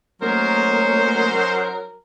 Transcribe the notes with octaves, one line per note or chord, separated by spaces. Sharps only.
F#3 A3 A#3 C#4 D#4 A#4 C5